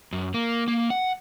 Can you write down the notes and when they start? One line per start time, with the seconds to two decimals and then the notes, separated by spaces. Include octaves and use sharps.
0.12 F#2
0.34 A#3
0.68 A#3
0.90 F#5